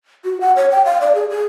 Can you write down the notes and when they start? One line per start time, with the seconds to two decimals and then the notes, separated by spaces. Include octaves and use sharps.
0.25 F#4
0.41 F#5
0.56 C#5
0.71 G5
0.85 F5
1.01 D5
1.15 G#4
1.30 G#4